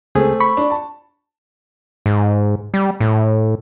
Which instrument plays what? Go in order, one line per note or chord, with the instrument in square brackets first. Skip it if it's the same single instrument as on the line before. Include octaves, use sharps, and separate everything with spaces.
[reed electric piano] C#2 G#4 [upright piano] A3 C4
[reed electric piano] B5 C#6
[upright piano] D4
A5
[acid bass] G#2
G3
A2